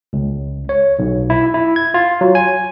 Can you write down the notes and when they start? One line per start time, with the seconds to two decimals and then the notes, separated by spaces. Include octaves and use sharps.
0.13 C#2
0.69 C#5
0.99 B1
1.30 E4
1.54 E4
1.76 G#6
1.94 F4
2.21 F#3
2.35 G#5